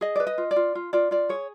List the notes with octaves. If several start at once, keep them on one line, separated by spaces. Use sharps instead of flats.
G#4 D#5
B4 D5
D#5
F4
D5
F4
F4
F4 D5
F4 D5
G#4 C#5